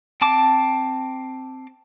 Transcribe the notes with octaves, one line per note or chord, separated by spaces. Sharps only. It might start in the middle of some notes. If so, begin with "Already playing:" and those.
C4 A5 D6